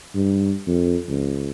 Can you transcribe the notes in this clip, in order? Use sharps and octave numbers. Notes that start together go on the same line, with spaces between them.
G2
F2
C#2